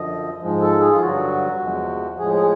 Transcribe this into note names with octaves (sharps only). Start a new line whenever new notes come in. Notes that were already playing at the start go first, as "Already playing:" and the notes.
Already playing: F#2 D3 F3 D#5
G#2 F3 G#3
A4
G#4
F4
G2 D3 F#3 F#4
E2 C3 F3 G#3
A2 F3 G#3 G#4
G#4